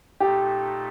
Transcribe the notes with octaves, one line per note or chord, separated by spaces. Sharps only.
A#2 A3 D#4 G4 A4